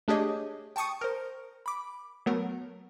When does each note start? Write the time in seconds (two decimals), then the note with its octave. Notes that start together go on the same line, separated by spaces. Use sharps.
0.08 A3 D4 G4 G#4 C#5 D#5
0.76 G5 A5 C#6 D#6 C#7
1.01 A#4 C5
1.66 B5 D6
2.26 F#3 A3 B3 A#4